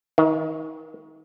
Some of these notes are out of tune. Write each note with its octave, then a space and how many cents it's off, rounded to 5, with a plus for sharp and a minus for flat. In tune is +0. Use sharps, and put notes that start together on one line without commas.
D#3 +30